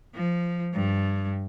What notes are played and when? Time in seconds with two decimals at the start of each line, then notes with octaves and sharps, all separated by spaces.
0.14 F3
0.73 G2